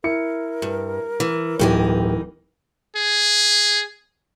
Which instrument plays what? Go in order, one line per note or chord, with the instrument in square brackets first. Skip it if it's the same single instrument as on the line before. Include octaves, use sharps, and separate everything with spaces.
[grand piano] E4 C#7 [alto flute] A#4
[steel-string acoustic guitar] G2
E3
[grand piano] D1 G4 [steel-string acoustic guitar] G2 E3 D#4
[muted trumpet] G#4